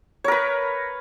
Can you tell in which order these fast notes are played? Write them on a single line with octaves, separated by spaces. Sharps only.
C#5 A#4 B4